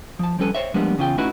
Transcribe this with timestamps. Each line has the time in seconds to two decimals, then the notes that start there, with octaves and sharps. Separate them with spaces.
0.19 F3 A5
0.39 F3 G3 C#4 A4 B4
0.55 C5 C#5 E5
0.74 F3 G3 G#3 A#3 B3 D4
0.98 E2 C#3 F4 G5
1.18 A3 C#4 D#4 E4 F#4 B4